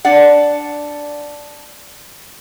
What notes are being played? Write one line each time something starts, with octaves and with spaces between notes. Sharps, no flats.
D4 D5 F#5